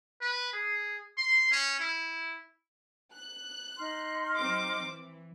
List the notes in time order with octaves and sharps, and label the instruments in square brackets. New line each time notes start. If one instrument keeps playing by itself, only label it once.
[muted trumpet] B4
G#4
C6
C#4
E4
[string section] F#6
[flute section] D#4 C6 F6
[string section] F#3 C4 D6
E3